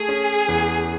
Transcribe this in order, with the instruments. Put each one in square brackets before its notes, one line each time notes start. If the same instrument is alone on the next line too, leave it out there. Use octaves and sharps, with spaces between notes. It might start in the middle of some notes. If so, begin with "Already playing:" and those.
Already playing: [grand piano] A3 [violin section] G#4
[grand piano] C#4
E2